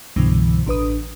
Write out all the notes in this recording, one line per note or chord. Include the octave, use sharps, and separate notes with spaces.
C2 G2 B2 D3 E3
A1 D4 B4 D#6